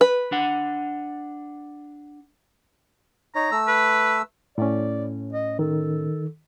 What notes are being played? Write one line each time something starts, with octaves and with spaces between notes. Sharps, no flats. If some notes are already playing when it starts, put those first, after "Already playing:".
B4
D4 F#5
D#4 C#5 A#5
A3 E6
B4
A2 C#4 D5
D#5
D#3 A4